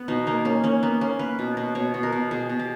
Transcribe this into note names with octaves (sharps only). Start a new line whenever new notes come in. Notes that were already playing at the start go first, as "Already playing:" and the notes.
Already playing: B3
B2 D#4
A#3 D#4
A#3 C#4
A#3 C#4
A#3 B3
A#3 C#4
A#3 B4
B2
B2
B2 C#5
B2
A#4
B2
B2 G#4
B2
G4